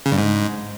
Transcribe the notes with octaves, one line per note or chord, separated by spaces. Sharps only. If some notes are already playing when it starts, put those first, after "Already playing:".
C#3
G2
G#2